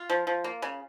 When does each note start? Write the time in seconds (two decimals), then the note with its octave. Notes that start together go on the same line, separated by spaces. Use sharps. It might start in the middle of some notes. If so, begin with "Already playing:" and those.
Already playing: F4
0.10 F3
0.27 F3
0.44 A#3
0.62 C#3